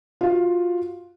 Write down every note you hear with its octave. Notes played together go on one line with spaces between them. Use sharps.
F4 F#4 F5